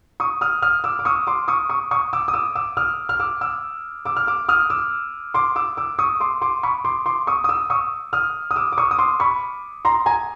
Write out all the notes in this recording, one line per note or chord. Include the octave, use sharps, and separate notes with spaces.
C#6 D#6
D#6 F6
D#6 F6
D6 E6
D6
C#6 D#6
C6 D6
C#6 D#6
C#6 D#6
C#6 D#6
D6 E6
D#6
D6 E6
D6 E6
D#6 F6
F6
D6 E6
D6 E6
D6 E6
F6
D6 E6
D#6 F6
D6 E6
C6 D6
D6 E6
D6 E6
C#6 D#6
C6 D6
C6 D6
B5 C#6
C6 D6
C6 D6
C#6 D#6
D#6
D6 E6
C#6 D#6
D#6 F6
D#6
D6 E6
D6
C#6 D#6
D#6
C6 D6
B5 C#6
A#5 C6
G#5 A#5